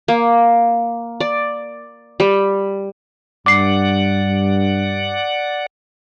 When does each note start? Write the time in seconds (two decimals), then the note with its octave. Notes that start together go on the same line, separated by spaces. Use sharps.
0.08 A#3
1.20 D5
2.20 G3
3.46 G2 D5 F#5 D6 C7